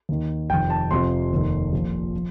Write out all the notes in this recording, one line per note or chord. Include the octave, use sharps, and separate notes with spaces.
D#2 D#3
F1 F2 D#3 G5
A5
F1 F2 C3 F3 C6
F1 D#2 D#3
A#1 A#2 F3
F3